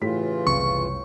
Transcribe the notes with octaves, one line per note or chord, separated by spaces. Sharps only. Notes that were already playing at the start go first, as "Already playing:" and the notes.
A2 C#3 E3 F4 G4 B6
F#1 C2 C#6